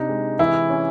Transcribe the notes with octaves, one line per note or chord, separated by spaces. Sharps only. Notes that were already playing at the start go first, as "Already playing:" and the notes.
Already playing: C3 D4 D#4
G#3
E3 E4
C#4